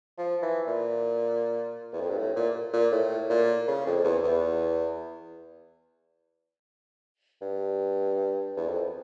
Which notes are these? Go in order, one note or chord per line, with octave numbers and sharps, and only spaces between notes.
F3
E3
A#2
E2
F2
G2
A2
A#2
A#2
A2
A#2
C#3
F2
E2
E2
G2
E2
F2